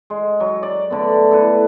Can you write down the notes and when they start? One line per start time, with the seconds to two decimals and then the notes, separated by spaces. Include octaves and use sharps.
0.10 G#3
0.40 F#3
0.63 D5
0.90 D3 A3 B3
1.31 E4 A4 B4